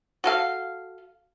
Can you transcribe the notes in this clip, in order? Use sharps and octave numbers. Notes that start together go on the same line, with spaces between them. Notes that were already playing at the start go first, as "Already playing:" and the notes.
F#4 A4 F5